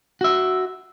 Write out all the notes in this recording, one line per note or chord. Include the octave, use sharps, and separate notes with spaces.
F#4 E5